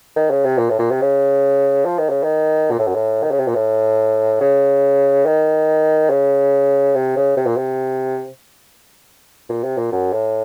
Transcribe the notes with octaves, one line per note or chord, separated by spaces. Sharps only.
D#3
C#3
C3
A#2
A2
A#2
C3
C#3
F3
D#3
C#3
D#3
A#2
A2
F#2
A2
D#3
C#3
C3
A#2
A2
C#3
D#3
C#3
C3
C#3
C3
A#2
C3
A#2
C3
A#2
F#2
A2